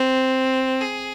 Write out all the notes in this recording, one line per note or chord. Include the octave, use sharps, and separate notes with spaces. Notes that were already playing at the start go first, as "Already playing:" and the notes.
Already playing: C4
G#4